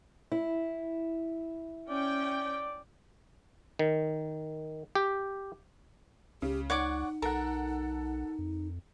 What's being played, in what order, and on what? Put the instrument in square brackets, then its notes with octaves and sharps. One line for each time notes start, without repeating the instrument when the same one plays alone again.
[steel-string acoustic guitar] E4
[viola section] C#4 G5 [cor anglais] D5
[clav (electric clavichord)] D#3
G4
[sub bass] C#2 [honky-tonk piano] C#3 [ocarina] G4
[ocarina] D#4 [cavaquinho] C#5 D5 D6 [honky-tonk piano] F#5
[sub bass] B1 [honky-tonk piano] A4 F#5 [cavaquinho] A#4
[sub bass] F2